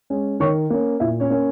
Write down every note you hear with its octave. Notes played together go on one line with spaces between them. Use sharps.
G#3 C#4
D#3 C#5 C#6
A#3 C#4
A#2 E4 E5
C#4 C#5
A#3 C#4